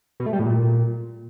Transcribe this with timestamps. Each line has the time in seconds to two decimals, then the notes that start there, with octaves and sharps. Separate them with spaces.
0.20 B2
0.26 A3
0.33 G3
0.39 A2
0.46 A#2